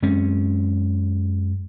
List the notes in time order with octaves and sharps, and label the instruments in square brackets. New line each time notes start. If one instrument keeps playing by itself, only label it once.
[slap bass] F#2 G#3 C4 C#4